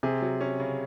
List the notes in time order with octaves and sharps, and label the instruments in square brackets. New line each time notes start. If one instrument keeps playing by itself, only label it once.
[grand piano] C3 [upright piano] G#4
[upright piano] F#3
C#4
C#3